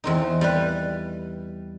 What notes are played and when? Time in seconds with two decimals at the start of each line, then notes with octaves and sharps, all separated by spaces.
0.04 E2 C4 D#4
0.41 G3 B4